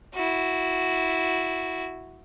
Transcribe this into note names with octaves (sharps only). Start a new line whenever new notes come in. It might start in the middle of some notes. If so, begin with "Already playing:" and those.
E4 F#4